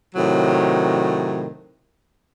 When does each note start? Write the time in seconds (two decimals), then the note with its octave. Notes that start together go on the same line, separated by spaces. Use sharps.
0.14 A2 C3 D#3 F#3